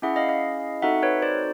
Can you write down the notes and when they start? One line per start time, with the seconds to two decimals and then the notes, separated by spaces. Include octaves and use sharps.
0.02 C#4 E4 G#4 E5 F#5
0.16 D#5 F5
0.29 D#5 F5
0.82 C4 D#4 F#4 A4 E5 F#5
1.03 B4 C#5
1.22 C5 D5